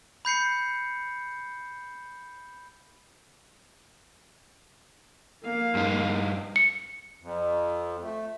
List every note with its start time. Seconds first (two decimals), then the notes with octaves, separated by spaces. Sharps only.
0.25 B5 G6 C7 C#7
5.44 A#3 F5
5.75 G2 D#4
6.56 C#7
7.22 F2
8.03 A3